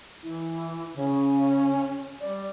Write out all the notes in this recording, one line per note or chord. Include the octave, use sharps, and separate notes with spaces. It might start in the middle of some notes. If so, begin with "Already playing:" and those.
E3 E4
C#3 C#4
G3 D5